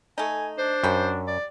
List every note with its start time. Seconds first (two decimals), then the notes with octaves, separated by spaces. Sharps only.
0.18 A3 D#4 G#5
0.58 D4 C5
0.84 F#2 G3 G5
1.28 D5